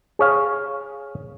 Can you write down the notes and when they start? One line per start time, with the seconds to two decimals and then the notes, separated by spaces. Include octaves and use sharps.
0.19 G#4 C#5 F5